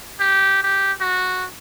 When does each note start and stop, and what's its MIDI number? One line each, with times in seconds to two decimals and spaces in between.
0.20 0.62 67
0.63 0.92 67
1.01 1.45 66